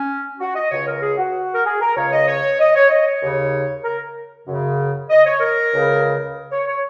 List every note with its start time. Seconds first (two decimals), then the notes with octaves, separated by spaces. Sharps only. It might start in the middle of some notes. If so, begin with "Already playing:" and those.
Already playing: C#4
0.39 F#4
0.55 D#5
0.71 C#2 C#3 C#5
0.86 A#4
1.02 G#4
1.18 F#4
1.54 A#4
1.66 G#4
1.81 A#4
1.96 C#2 C#3 C#5
2.13 D#5
2.28 C#5
2.59 D#5
2.75 C#5
2.90 D#5
3.06 C#5
3.22 D#2 C#3
3.84 A#4
4.47 F#2 C#3
5.10 D#5
5.26 C#5
5.41 A#4
5.73 C#2 C#3
6.52 C#5
6.67 C#5